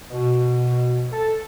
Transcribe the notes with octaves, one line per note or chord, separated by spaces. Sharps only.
B2
A4